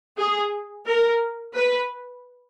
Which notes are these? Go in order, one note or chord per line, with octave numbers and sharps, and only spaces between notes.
G#4
A#4
B4